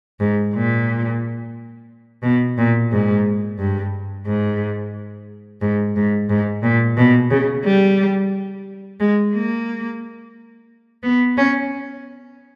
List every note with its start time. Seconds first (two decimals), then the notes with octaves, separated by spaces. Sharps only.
0.20 G#2
0.55 A#2
2.23 B2
2.58 A#2
2.92 G#2
3.59 G2
4.26 G#2
5.61 G#2
5.96 G#2
6.29 G#2
6.63 A#2
6.97 B2
7.31 C#3
7.64 G3
9.00 G#3
9.34 A#3
11.03 B3
11.38 C#4